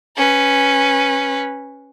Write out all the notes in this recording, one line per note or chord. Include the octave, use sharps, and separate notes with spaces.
C#4 B4